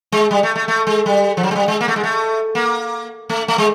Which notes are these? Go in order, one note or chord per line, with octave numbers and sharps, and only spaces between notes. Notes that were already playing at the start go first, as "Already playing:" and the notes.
G#3
G3
A3
A3
A3
G#3
G3
F3
F#3
G#3
G3
G#3
A#3
A3
G#3
A3
A#3
A3
A3
G#3